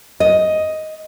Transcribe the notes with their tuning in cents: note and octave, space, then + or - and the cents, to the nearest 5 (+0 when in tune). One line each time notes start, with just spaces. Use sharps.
D#5 +5